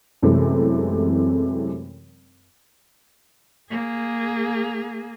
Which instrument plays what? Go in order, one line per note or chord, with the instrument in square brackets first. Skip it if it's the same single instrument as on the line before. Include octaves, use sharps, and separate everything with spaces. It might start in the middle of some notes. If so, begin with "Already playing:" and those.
[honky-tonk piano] F#2 C3 E3 G#3 A3 C4
[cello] A#3 G#4